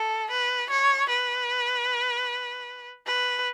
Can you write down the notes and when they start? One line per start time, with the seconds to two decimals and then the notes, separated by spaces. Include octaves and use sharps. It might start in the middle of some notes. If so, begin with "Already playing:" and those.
Already playing: A4
0.31 B4
0.70 C#5
1.09 B4
3.07 B4